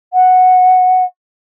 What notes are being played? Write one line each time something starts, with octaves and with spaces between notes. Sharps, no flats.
F#5